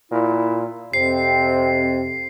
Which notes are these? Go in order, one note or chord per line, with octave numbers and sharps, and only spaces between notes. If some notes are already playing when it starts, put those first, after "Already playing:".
A#2 E4
F2 C3 C4 C7